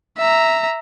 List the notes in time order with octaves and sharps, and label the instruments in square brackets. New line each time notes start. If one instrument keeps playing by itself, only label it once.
[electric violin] E5 A#5